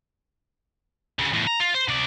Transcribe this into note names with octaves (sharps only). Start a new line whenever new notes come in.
D2 C#3
E2 A2
A#5
F4
C5
C3 D5